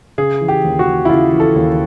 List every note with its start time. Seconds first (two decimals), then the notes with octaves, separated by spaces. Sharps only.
0.18 C#3 G#4
0.41 E3
0.48 G4
0.64 D#2
0.79 F#4
0.87 D#2
1.05 E4
1.09 C#3 F4
1.33 E3
1.40 A4
1.55 D#2